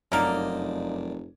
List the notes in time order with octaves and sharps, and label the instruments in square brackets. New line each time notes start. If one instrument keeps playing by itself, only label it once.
[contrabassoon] F1 [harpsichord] F#2 D5 [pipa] D3 A#3 D#4